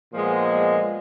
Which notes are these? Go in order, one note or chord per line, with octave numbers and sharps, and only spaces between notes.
A#2 F3 G#3 B3